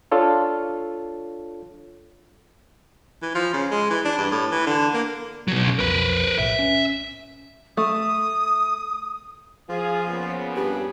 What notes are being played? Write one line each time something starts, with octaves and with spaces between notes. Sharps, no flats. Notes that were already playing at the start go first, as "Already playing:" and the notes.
D4 F4 A4 C#5
E3
F3
C#3
G#3
E3
D4
G2
A2
E3
D3
A#3
B2 F#3
C#3
B1 F2 A#4 B4
B1 A2 E5
C#4
A3 D#6
F3 F4 G#4
A#2 C#3 B3
G2 G4